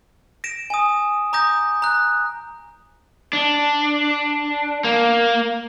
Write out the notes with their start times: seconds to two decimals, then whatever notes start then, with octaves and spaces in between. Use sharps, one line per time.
0.44 A#6 D7 E7
0.70 G#5 D#6
1.33 A#5 D6 D#6 G6 A#6
1.82 A#5 F#6
3.33 D4
4.84 A#3